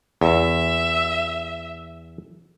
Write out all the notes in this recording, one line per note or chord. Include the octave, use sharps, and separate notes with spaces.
E2 E5